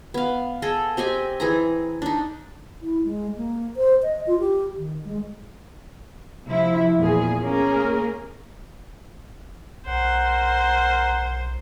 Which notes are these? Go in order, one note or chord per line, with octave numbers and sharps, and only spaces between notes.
B3 F5
G#4 A4 D#5
C4 G4 D#5 G#5
E3 G#4 A#5
D4 D#4
E4
G#3
A#3
C5
D#5
F4
G4
D#3
G#3
C3 F3 E4
E2 A#2 G#4
A#3 C#4 G#4 A#4
B1 A#4 C5 F#5